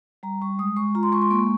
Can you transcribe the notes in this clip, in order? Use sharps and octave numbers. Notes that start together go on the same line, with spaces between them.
G3 A#5
G3 C#6
G#3 D#6
G#3 C#6
F4 A#5
C6
G#3 C#6
C6
A#3 C#6